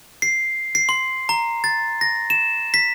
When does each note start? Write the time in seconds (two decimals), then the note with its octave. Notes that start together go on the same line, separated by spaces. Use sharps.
0.22 C7
0.75 C7
0.89 C6
1.29 A#5
1.64 A6
2.01 A#6
2.30 E7
2.74 B6